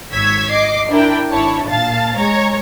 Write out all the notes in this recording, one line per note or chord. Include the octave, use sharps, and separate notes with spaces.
G#1 C#5 E6 G#6 B6
D#5 D6 C7
D4 E4 A#4 G5
G#1 D4 E4 C#5 A5
A#2 F5 A5 A6
G#3 C#5 A#5